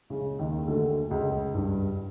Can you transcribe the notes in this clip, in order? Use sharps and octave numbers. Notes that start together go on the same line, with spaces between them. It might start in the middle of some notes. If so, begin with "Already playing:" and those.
C#2 C#3
D#2 D#3
D2 D3
C#2 C#3
G2